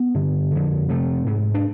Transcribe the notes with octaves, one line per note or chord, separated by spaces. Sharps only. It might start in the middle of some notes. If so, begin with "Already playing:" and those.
Already playing: B3
G2 D3
F2 D3
F2 C3 A3
G#2
D4